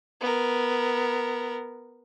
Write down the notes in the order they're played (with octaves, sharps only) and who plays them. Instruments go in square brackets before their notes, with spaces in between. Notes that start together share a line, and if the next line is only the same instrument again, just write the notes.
[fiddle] B3 A#4